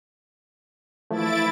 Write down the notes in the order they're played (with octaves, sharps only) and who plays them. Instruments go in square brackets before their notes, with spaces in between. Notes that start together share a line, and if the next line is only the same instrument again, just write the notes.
[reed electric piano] E3 F3 A3 [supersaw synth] E4 A6 D7